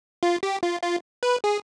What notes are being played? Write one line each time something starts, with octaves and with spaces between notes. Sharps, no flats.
F4
G4
F4
F4
B4
G#4